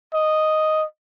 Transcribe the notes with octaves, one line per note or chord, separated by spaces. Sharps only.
D#5